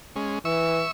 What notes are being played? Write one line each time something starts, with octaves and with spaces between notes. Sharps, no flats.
G#3 C#4
E3 E5 C#6 E6